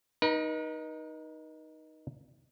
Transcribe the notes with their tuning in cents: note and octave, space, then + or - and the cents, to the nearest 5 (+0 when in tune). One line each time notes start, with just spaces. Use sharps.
D#4 +0 B4 -45